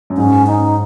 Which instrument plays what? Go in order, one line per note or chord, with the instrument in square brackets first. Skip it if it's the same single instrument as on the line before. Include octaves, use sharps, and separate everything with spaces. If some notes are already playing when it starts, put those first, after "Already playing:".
[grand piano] F#2
[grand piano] G#2 [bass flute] C#4
[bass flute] D#4